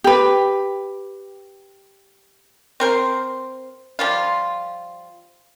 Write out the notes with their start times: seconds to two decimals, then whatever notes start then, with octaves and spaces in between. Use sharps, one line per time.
0.04 G4 B4
2.80 C4 A#4 C5
3.99 F3 G3 F4